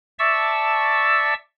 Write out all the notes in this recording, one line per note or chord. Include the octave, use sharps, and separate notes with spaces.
D5 E5 A5 C#6 E6